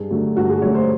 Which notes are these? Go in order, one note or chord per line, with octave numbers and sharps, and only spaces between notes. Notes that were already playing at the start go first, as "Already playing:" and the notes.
Already playing: G2 G#4
D3 F#3 A3
G2 F#4
G#4
D3 F#3 A3 C#5
C5